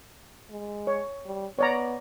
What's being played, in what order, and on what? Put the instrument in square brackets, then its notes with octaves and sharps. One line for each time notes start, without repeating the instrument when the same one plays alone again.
[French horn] G#3
[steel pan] C#5
[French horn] G3
[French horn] B3 [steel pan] C#5 D5 A#5